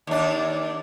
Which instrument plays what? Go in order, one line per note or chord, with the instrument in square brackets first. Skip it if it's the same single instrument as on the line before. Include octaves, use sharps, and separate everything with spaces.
[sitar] D#2 D4